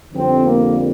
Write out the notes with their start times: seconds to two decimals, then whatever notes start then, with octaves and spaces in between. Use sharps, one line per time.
0.13 F2 D3 G3 C4
0.45 A#3